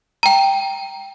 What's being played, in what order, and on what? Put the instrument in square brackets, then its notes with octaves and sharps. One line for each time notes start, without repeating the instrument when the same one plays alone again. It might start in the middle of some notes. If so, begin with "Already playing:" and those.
[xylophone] G5 A#5